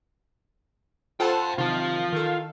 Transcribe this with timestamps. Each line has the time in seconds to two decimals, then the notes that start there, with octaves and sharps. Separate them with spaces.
1.20 F4 A4 C5 F#5 G5 A5
1.58 C3 D#3 F4 F5 A5
2.13 D#3 A4